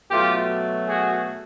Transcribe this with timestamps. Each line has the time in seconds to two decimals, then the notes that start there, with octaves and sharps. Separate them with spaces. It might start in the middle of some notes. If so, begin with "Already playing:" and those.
0.11 B2 F#3 A3 F4 G4
0.88 F#4 G#4